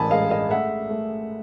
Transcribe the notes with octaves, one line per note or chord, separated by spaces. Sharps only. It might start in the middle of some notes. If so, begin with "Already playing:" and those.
Already playing: A1 A2 G#5 A5 B5
G#3 D#5 F5
D#5 F5
A3 E5 F#5
A3